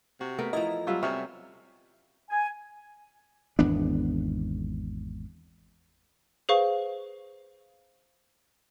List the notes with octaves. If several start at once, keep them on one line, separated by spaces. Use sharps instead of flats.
C3 F#4
A3 B3 A#4
E2 F3 A3 E4 D#5 A#5
F#3 G3 F4 A4 E5
C3 F#3 G3 C#4 E5 C#6 F6
G#5
G#1 E2 B3 D4
G#4 B4 C5 F5 C#6